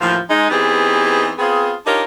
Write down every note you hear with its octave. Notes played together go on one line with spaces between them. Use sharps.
D#2 A2 E3 F3
G#3 D#4
E3 B3 C4 D#4 G4 G#4
B3 C4 F4 G#4
D4 D#4 F4 G4 A#4 C#5